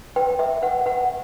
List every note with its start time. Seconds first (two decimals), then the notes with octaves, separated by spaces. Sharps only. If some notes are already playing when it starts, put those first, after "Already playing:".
0.16 B4 G5
0.39 B4 E5
0.63 B4 F#5
0.86 B4 F#5